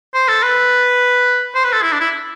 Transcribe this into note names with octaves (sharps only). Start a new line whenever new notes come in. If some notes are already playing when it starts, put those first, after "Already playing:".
C5
A4
B4
C5
B4
A4
E4
D4
E4